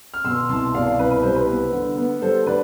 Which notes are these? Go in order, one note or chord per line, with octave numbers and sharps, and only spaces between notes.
F6
B2 C6 E6
C2 A5 C6
B2 D5 F5
D5 F5
C2 B4
B4
G3 C5
B4
B3
D3
B3
G3 A4 C5
D3 B4 D5